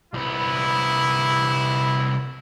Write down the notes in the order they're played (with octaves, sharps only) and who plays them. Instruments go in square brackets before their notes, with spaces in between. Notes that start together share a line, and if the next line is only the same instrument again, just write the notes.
[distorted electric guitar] C2 B3 [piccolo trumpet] E4